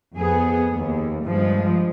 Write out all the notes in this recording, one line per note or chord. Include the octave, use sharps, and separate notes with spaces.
F2 B3 G#4
D#2
G2 F3 G#3